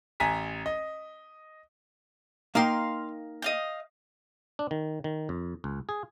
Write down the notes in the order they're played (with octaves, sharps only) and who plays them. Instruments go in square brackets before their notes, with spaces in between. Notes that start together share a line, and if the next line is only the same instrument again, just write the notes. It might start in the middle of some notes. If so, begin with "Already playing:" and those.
[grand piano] A1 G#5 A#5 B6
D#5
[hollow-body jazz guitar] A#3 D#4 G5 [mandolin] F5 C6
[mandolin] D#5 F5 G6
[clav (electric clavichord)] D4
D#3
D#3
F2
C#2
G#4